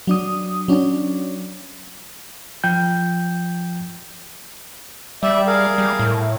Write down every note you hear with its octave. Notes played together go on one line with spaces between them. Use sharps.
F#3 D4 D#6
F#3 C#4 D4
F3 G5 G6
G3 D5 E5
G#4 A#4 F5
G3
A2